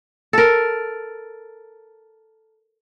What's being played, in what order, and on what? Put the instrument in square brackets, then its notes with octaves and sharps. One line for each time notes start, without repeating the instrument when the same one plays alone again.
[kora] A4 A#4